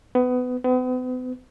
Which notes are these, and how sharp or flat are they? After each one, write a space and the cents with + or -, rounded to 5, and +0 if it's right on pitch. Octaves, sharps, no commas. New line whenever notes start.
B3 +20
B3 +40